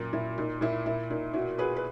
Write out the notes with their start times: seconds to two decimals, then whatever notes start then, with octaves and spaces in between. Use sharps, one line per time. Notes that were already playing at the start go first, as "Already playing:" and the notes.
Already playing: F#2 A#2
0.13 A#2 E4
0.38 A#2 D#4
0.61 A#2 E4
0.86 A#2 E4
1.10 A#2 D#4
1.33 B2 E4
1.58 B2 G#4 B4
1.76 B4